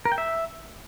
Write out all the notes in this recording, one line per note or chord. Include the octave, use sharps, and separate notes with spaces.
A#4
G5
E5